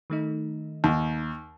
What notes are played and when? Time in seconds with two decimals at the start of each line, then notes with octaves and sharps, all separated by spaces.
0.10 D#3 A3 D#4
0.84 D#2